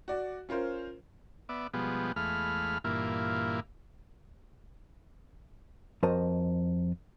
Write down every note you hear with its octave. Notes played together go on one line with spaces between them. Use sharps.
F#4 D5
C#4 F4 A#4 C5
B3 D5 E5
B2 F3 G3 G#3 B3
E2 G#3 A3 F5 B5 F6
G2 A#2 E3 A#3 E4 F4
F2 F#4 A#4 C5 D#5 A5